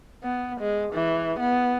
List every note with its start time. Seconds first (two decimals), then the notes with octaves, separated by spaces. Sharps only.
0.24 B3
0.61 G#3
0.93 E3
1.39 B3